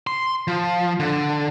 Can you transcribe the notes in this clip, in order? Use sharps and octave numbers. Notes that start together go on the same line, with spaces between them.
C6
F3
D3